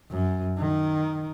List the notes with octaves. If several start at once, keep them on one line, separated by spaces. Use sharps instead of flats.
F#2
D#3